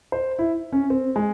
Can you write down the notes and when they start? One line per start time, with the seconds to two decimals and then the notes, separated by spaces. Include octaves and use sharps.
0.12 C5
0.39 E4
0.72 C#4
0.90 C4
1.16 G#3